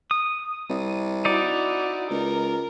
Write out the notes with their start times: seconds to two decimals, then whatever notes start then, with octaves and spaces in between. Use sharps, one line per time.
0.11 D#6
0.70 C2
1.25 D#4 E4 F#4 D5
2.11 C#2 A#4